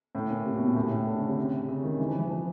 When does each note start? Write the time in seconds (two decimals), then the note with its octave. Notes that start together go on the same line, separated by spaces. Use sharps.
0.15 A2
0.30 A#2
0.45 C3
0.55 B2
0.66 A#2
0.76 A2
0.91 A2
1.07 D3
1.16 C#3
1.27 C3
1.69 C#3
1.84 D#3
1.99 E3
2.09 F3
2.19 E3
2.30 F3